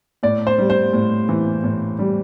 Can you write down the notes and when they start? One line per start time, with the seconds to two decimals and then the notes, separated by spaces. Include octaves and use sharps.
0.23 A2 D5
0.47 C5
0.58 G3
0.70 C5
0.93 A2
1.29 E3
1.64 A2
1.99 G3